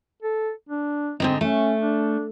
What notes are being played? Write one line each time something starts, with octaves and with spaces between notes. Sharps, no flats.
A4
D4
G#2 D3 C4 D#4
A3 C#4
D4